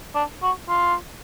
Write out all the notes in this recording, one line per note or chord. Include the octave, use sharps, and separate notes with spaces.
D4
F#4
F4